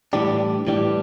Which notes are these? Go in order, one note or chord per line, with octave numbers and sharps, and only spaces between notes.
A2 E3 G3 D4 G4
A2 E3 G3 D4 G4